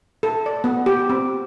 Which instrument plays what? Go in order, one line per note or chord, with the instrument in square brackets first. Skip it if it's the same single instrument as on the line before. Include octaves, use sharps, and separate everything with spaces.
[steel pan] A4
D5
B3
G4
C4